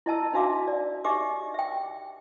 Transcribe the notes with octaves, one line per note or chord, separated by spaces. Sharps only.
E4 D#5 A5 E6
D4 D#4 F#4 E5 F5 D6
D5
D#4 G4 D#5 E5 D6
E5 G5